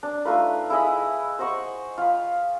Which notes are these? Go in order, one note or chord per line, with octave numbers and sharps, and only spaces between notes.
D4
A3 D#4 F4 B4
E4 G#4 D#5 B5
C5 D#5 F#5 C#6
F4 B5